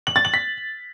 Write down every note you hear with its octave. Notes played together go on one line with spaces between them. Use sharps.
F#7
A6
F#7
B6